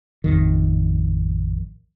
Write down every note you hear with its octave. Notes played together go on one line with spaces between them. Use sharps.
A1 F2 D#3